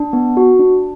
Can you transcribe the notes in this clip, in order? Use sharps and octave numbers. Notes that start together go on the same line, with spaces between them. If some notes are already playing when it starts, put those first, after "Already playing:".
Already playing: D4
B3
F#4
D4